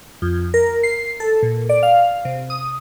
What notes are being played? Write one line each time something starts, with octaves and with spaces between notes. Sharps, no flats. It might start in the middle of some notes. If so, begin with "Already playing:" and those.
F2
A#4
C7
A4
A#2
D5
F5
C3
D#6